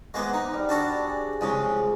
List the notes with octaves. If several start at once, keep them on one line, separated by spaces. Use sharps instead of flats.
G#3 A#3 B3 F#4 C5 D6
D#4 A#5
G3
D4 F#4 A4
G#4
C2 C#3 F3 G#3